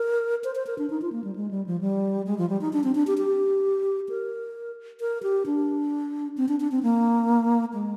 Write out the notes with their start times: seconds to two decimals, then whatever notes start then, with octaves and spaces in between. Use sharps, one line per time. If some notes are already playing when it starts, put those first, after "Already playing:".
Already playing: A#4
0.44 C5
0.55 C5
0.67 A#4
0.78 D4
0.90 D#4
1.02 F4
1.12 A#3
1.24 G3
1.36 G#3
1.51 G3
1.66 F3
1.81 G3
2.26 G#3
2.38 F3
2.49 G3
2.61 D#4
2.73 D4
2.84 C4
2.95 D4
3.07 G4
3.18 G4
4.09 A#4
5.00 A#4
5.23 G4
5.46 D4
6.37 C4
6.48 D4
6.60 D4
6.72 C4
6.83 A#3
7.74 G#3